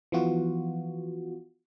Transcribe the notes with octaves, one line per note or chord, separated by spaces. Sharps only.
E3 F3 B3 F4 F#4